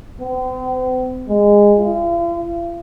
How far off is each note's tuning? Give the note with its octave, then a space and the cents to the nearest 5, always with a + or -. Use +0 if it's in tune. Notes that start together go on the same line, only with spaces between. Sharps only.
C4 -40
G#3 -20
F4 -45